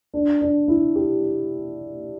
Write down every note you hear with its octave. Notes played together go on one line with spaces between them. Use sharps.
D4
D4
E4
G4